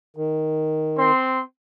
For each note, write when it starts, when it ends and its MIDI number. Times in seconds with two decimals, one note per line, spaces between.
0.17 1.11 51
0.98 1.43 60
0.98 1.43 84